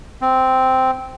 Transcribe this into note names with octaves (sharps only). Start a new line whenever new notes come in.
C4